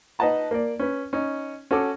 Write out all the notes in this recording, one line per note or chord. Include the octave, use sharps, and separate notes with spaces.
D#4 B4 D#5 F#5 A5 A#5
A#3 D5
C#4 B4
C#4 D#4
C#4 F#4 A4 D6